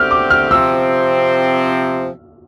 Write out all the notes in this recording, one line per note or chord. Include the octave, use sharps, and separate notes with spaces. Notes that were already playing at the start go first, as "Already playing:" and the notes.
Already playing: D3 A3 C4 G4 F6
D6
F6
C3 F3 C4 E6